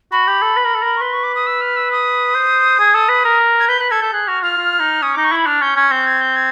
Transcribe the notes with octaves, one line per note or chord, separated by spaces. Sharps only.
F#4 B5
G4
A4
B4
A#4
A4
A#4
C#6
B4 C6
C#6
D6
D#6
E6
F6
E6
D#6
C5
G#4
A4
B4
A#4
G#6
B4 G6
B4 F#6
A4 G#6
A4 G6
G#4 F#6
F#4 F6
F4 F6
F4
D#4
C#4 D#6
D#4 D6
C#6
E4 B5
D4 F6
C#4 G6
C#4 G#6
C4 G6
G#6
G6
G#6